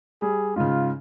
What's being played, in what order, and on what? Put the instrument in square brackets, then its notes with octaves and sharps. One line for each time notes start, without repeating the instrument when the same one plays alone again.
[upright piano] G3 [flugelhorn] G#4
[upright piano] G#2 C#3 [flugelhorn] F4